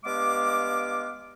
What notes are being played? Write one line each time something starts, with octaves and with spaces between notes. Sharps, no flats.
G2 G#3 B3 F5 D6